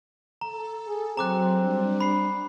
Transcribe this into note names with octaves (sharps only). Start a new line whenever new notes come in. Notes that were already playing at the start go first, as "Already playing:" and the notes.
A4 A#5
G#4
F#3 C4 A#5 D6 F#6
G3 D4
B5 C7